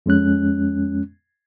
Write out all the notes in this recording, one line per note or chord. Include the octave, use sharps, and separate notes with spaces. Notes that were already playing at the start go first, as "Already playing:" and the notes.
F2 G#3 C#4 F#6